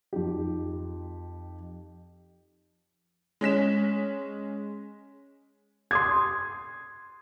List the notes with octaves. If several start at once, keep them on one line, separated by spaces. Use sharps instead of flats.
F2 D#4 G4
G#3 C#4 B6 E7
C6 D#6 G#6